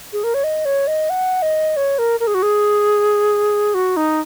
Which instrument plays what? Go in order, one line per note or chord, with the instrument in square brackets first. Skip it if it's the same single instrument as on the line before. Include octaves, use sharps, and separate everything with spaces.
[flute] G#4
A#4
C#5
D#5
C#5
D#5
F#5
D#5
C#5
A#4
A#4
G#4
F#4
G#4
F#4
D#4